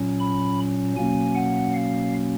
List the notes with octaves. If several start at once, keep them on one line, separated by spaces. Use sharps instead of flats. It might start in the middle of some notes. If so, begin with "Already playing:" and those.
Already playing: A#2 F#3 C#4
B5
B2 F#3 A#3 C#4 G#5
F#5
F5